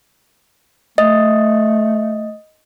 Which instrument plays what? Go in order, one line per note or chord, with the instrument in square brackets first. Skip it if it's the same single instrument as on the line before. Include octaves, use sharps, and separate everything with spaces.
[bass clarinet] A3 [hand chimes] D#5